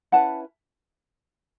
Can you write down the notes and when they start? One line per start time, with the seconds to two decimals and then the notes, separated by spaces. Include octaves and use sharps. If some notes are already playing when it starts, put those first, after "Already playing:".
0.12 C#4 E4 B4 F#5 A5